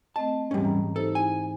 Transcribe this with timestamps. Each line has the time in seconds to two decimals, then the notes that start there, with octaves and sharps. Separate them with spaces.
0.16 A3 C4 D#5 A5
0.51 G#2 E3 G3 C#4
0.65 A#5
0.96 D#4 G4 A4 C5
1.15 E4 G#5